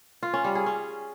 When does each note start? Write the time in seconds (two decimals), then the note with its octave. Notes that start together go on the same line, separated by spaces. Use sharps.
0.23 F4
0.33 C#4
0.44 G3
0.55 G#4
0.66 C#4